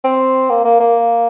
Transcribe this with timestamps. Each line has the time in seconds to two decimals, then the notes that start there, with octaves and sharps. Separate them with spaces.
0.04 C4
0.50 A#3
0.65 A#3
0.80 A#3